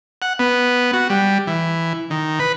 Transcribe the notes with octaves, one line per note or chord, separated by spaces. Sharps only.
F#5
B3
F#4
G3
E3
D#3
B4